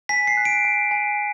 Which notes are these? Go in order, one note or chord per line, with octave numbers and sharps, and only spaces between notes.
G#5 B6
C7
F#6
D7
G#5
G#5